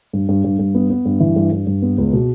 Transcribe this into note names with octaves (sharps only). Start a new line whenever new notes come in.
G2
G2
G2
G2
B3
B3
G2
E3
G2
G2
G2
B3
C#2
B2